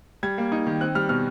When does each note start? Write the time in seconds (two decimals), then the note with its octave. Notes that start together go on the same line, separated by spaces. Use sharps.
0.23 G3 G#6
0.38 A#3
0.52 D#4
0.67 D#3
0.81 C4 F#6
0.95 G3 F6
1.09 B2 F6